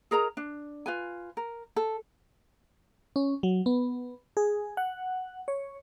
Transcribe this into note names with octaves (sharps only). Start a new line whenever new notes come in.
G#4 A#4 D#5 A#5
D4
F4 B4 G#5
A#4
A4
C#4
F#3
B3
G#4
F#5
C#5